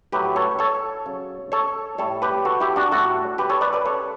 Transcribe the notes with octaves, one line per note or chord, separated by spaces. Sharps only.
A2 F#3 G4 B4
A4 C#5
A4 C#5
C#3 F#3
A4 C#5
A2 G3 A4 C#5
G4 B4
F#4 A4
E4 G4
D4 F#4
A2 G3 F#4 A4
G4 B4
A4 C#5
B4 D5
B4 D5
C#3 G3 A4 C#5